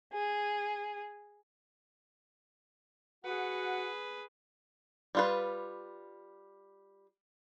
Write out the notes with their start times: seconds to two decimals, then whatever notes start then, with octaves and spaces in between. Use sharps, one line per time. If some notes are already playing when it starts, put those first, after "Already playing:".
0.13 G#4
3.25 F#4 G#4 B4 F#5
5.15 G3 F4 B4